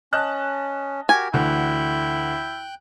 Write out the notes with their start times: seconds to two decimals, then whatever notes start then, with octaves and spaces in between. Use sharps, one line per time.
0.13 C#4 D#5 A5 F#6
1.09 F#4 G4 A#4 G#5
1.33 D2 D3 E3 E4 G5 F#6 G6